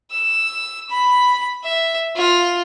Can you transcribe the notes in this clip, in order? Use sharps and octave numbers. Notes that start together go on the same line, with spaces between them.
E6
B5
E5
F4